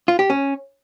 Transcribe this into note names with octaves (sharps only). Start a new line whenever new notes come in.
F4
G4
C#4